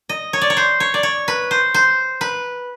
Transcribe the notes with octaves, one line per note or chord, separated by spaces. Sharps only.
D#5
C#5
D5
C#5
C5
C#5
D5
C#5
B4
C5
C5
B4